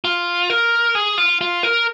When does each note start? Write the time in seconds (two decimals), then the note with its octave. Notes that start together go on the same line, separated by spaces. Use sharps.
0.05 F4
0.50 A#4
0.95 G#4
1.18 F4
1.41 F4
1.63 A#4